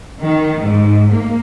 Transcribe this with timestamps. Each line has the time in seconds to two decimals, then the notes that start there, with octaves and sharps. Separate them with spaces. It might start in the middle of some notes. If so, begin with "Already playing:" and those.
0.20 D#3
0.61 G#2
1.11 A#3